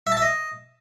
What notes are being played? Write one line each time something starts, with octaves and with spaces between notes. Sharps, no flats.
E5
A5
E5
D#5